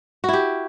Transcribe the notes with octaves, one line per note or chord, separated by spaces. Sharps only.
E4 F#4 G4